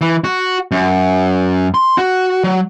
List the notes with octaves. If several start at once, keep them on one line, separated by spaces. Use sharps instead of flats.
E3
F#4
F#2
C6
F#4
F#3